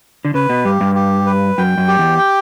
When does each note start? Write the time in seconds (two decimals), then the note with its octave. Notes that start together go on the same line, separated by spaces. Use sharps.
0.25 D3
0.34 C#3 B4
0.49 B2
0.65 G2 G4
0.81 G2
0.95 G4
1.26 B4
1.58 F#2 G5
1.78 F#2
1.88 G4
1.99 E2
2.18 G5